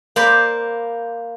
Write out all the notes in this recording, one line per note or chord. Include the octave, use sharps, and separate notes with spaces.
A#3 C5 D5 B5